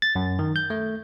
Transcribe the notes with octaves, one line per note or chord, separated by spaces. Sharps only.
A6
F#2
D#3
G6
A3